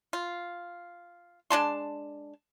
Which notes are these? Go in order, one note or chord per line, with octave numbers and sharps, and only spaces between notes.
F4
G#3 D4 A5 C6